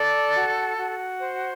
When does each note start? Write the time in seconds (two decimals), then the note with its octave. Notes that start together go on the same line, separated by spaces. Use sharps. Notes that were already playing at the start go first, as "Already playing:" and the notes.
Already playing: A4 D5
0.34 F#4
0.77 F#4
1.20 C5